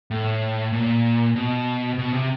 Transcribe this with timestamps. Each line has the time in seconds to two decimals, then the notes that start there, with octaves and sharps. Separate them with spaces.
0.11 A2
0.73 A#2
1.36 B2
1.99 B2
2.14 C3